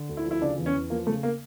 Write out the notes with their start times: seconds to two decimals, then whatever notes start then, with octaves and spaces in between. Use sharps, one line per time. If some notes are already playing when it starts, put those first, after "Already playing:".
Already playing: D3
0.09 D2
0.17 E4
0.25 F3
0.31 E4
0.41 C#3 D4
0.57 E2
0.66 C#4
0.74 E2
0.90 F3 A#3
1.06 C#3 A3
1.23 A#3